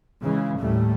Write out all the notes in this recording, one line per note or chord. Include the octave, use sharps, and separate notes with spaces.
C#3 E3 G#3
D#2 A2 G3 A3